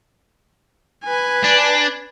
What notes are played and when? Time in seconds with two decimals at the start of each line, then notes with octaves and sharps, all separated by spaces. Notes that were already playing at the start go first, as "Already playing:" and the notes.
1.04 B4 G#5
1.44 D4